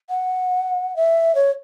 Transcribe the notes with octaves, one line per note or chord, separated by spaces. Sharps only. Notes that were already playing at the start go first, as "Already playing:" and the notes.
F#5
E5
C#5